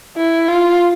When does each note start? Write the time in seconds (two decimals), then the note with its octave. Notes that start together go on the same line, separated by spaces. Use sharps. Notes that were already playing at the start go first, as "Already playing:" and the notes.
0.17 E4
0.48 F4